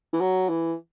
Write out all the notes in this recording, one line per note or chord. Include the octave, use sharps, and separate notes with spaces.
E3
F#3
E3